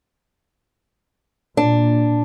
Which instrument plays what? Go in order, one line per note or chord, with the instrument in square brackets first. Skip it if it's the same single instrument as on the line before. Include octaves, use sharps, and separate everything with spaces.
[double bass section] A#2 [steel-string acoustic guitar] D4